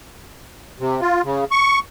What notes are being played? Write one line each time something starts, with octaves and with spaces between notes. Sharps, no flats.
C3
F4
C#3
C#6